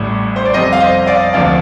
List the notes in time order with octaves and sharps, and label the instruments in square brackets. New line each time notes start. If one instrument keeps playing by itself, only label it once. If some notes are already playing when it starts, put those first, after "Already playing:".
Already playing: [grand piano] A1 A2 G3
C5
D5
F2 C3 G3 C5 D#5
F5
C5 D#5
D5 F5
D2 C3 F3 A#3 D5 F5